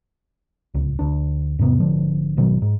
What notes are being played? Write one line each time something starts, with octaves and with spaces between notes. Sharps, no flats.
D1 C#2
D2 D4
E2 G#2 C3 B3
G#1 D3 F3
G#1 B2 D#3 F#3
G#2